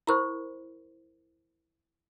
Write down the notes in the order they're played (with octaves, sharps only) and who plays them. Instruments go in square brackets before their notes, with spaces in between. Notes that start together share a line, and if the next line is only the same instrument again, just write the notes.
[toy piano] E4 A#4 C5 [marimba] B5 C#6